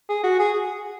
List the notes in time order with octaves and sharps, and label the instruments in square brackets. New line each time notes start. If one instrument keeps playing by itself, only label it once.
[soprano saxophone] G#4
F#4
G#4